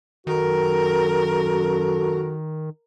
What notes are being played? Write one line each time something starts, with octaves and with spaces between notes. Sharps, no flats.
F#2 D#3 F#4 A4 A#4